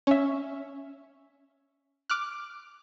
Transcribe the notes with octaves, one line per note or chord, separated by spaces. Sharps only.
C#4 E5
D6 F6 F#6